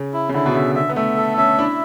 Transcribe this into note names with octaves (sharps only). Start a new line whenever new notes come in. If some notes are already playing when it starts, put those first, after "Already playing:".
Already playing: C#3
E4
C#3
D3 E4
B2
C#3 E5
D3 E5
B3
A3 E5
A4
C#4 E5
D4 E4